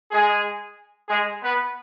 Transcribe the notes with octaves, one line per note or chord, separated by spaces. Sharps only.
G#3 G#4
G#3 G#4
B3 B4